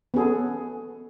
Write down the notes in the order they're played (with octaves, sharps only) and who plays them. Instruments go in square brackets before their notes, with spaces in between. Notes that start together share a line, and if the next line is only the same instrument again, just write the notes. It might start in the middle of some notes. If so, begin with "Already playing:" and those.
[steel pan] B3 C#4 G#4 A4